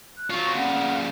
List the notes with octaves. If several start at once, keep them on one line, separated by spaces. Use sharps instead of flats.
F#6
F#3 F4 C#6
A#2 C#3 F#5